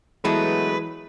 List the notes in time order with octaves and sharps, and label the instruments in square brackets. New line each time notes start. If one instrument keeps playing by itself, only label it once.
[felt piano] E3 [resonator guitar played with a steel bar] F#3 A3 B3 [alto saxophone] G#3 [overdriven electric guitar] B4